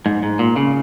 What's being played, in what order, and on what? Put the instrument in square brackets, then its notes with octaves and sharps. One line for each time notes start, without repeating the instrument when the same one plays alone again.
[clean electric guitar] G#2
G#2
A#2
C#3